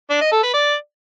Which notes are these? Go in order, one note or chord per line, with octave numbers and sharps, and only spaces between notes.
D4
D#5
A4
B4
D5